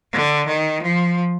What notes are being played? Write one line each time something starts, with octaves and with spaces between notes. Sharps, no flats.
D3
D#3
F3